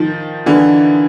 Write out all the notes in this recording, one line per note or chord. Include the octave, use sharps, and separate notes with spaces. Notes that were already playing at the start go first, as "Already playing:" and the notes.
Already playing: D#3 F3
D3 E3